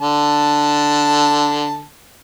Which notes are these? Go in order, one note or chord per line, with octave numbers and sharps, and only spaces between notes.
D3 A5